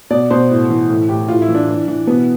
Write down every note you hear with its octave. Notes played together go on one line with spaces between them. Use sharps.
B2 D5
B2 C5
A2
E3
A2
A2 G4
A2 F4
E4
E3
D4
E3
E3
B2 B3